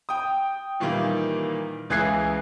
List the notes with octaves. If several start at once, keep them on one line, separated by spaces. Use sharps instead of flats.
G5 D#6
A#2 D#3 E3 G3 A#3
C#2 E3 G#4 F#6 G#6 C7